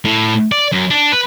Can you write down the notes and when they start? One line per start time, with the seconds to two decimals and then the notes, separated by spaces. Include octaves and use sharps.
0.05 A2
0.52 D5
0.72 F#2 F#3
0.90 D4
1.12 B4